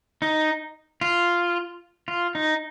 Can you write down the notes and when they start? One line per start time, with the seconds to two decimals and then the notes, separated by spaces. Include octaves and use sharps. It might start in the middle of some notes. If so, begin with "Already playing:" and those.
0.22 D#4
1.01 F4
2.08 F4
2.35 D#4